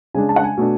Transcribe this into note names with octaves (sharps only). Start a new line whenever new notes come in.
C#3 G#3 D4 G#5
A5
F#5
G#5
B2 A3 D4